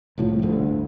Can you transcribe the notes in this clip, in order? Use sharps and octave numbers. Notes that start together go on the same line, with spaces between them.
C2 A2 F3
G1 D2 D3